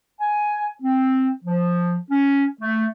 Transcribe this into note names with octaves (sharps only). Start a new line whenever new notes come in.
G#5
C4
F3
C#4
A3